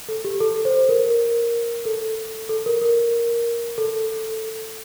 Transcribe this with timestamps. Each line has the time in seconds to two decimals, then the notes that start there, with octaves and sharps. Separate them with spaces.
0.09 A4
0.24 G4
0.41 A4
0.65 C5
0.89 A#4
1.85 A4
2.49 A4
2.66 A#4
2.82 A#4
3.78 A4